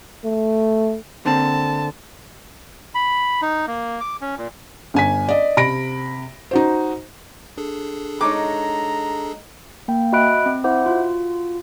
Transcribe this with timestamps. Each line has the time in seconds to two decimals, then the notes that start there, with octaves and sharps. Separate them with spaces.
0.24 A3
1.25 D3 A#3 C4 A5
2.95 B5
3.42 D#4
3.67 A#3
4.01 D6
4.21 C#4
4.37 A#2
4.94 G1 G#5 B6
5.28 D5 D#5
5.57 C3 B5 A#6 D7
6.51 D#4 F#4 C5
7.57 D4 G#4 A4
8.21 G#3 D#4 C#5 A#5 D6
9.88 A#3 G5
10.12 F#4 D#5 E5 B5 F#6 D7
10.46 C4
10.64 E4 C5 E5 F#5 D6
10.86 F4 F#4